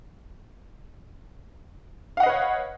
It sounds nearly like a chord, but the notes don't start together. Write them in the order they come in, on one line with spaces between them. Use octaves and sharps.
F5 F#5 D#5 B4 C#5